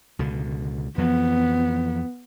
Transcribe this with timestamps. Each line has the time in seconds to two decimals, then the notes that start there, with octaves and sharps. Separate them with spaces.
0.19 C#2 B2 D3
0.98 F2 E3 F3 B3